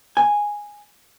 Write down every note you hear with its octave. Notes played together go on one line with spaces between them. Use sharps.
G#5